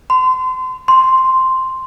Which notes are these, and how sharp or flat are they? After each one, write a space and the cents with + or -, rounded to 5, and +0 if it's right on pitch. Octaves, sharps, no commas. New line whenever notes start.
C6 -30
C6 +0